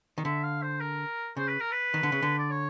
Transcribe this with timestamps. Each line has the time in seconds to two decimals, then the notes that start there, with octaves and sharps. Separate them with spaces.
0.18 D#3
0.24 D3 E5
0.43 F5
0.62 C5
0.80 A#4
1.37 C#3 C5
1.48 B4
1.60 A#4
1.71 B4
1.94 D#3
2.03 D3
2.12 C#3
2.22 D3
2.38 D5
2.50 C#5